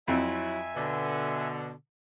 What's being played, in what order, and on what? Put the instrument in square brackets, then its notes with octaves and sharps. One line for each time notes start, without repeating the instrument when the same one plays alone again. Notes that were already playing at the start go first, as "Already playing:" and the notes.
[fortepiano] F2 [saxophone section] F#3 E4 [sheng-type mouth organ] E5 G#5
[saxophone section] B2 D3